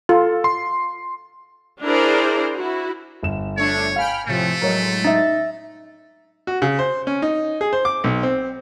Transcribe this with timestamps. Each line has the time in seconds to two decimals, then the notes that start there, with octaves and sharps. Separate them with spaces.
0.09 F4 A4
0.44 C6
1.82 D4 E4 G#4 A#4 C5 D5
2.55 E4 F#4
3.23 G1 E7
3.57 A3 D4 C#5
3.96 F5 G5 G#5 B5 F6
4.27 A2 C3 F3 A3
4.61 A2 F#3 G#3 A#4 C#5
5.04 D#4 E5 A6
6.47 F#4
6.62 C#3
6.79 C5
7.07 C#4
7.22 D#4
7.61 G#4
7.73 C5
7.85 D6
8.04 B1
8.23 C4